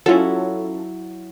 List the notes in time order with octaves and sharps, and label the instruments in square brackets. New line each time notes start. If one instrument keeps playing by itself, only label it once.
[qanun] F#3 E4 [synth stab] C#4 F4 A4